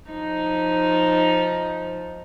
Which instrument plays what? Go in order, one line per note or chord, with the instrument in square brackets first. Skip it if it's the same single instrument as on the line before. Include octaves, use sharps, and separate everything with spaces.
[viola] F3 D#4